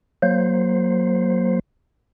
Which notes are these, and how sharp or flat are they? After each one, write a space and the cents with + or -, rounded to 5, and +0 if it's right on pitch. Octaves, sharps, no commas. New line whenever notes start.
F#3 +0 A#3 +0 C5 +0